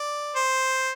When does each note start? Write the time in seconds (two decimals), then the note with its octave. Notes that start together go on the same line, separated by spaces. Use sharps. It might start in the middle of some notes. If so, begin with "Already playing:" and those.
Already playing: D5
0.36 C5